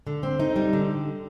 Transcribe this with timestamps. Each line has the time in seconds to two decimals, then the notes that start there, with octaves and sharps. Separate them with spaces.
0.07 D3
0.23 C4
0.39 D#4
0.56 G3
0.73 D3